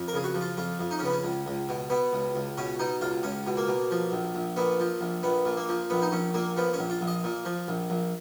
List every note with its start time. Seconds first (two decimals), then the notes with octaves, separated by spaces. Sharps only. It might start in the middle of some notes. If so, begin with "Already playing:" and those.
Already playing: F2
0.08 A#4
0.13 C#3 G#4
0.24 F#4
0.34 F3
0.41 F4
0.57 F2 F4
0.79 F2
0.91 D#4
0.99 C#4
1.02 C#3 B3
1.12 C#4
1.23 C#2
1.46 C#2
1.69 B2
1.90 B2 B3
2.13 C#2
2.36 C#2
2.58 B2 C#4
2.79 B2 D#4
3.01 C#2 F4
3.23 C#2 C#4
3.47 B2
3.57 A#3
3.68 B2
3.91 F3
4.12 A#1
4.35 A#1
4.57 A#2 B3
4.80 F3
5.01 A#1
5.23 A#1 B3
5.46 A#2
5.57 A#3
5.69 F3
5.90 A#1 B3
6.02 D#4
6.12 A#1 C#4
6.34 A#2 A#3
6.57 F3 B3
6.73 C#4
6.79 A#1
6.90 F4
7.01 A#1
7.07 D#5
7.24 A#2
7.45 F3
7.68 A#1
7.90 A#1